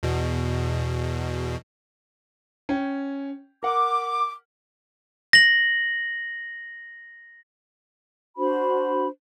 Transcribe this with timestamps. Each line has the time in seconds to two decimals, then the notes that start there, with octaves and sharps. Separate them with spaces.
0.03 E2 B2
2.69 C#4 G5
3.63 A#4 F#5 D6
5.33 A#6 F#7
8.37 D4 F#4 C5 B5